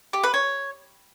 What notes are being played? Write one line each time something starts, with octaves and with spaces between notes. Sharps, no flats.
G4
B4
C#5